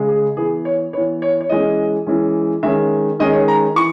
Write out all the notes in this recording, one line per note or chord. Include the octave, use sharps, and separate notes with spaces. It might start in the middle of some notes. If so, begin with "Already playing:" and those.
Already playing: C#3 G#3
G#4
E3 B3 G#4
C#5
E3 B3 C#5
C#5
C#5
E3 G#3 C#4 D#5
E3 G#3 C#4
D#3 G#3 C#4 E5
D#3 G#3 C#4 D#5
C#5
A#5
E3 C#6